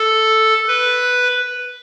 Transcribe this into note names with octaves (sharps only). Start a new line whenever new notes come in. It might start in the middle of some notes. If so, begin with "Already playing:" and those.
Already playing: A4
B4